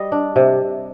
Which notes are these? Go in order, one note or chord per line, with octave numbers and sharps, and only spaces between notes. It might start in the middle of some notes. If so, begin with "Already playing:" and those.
Already playing: G3 D#5
D4
C3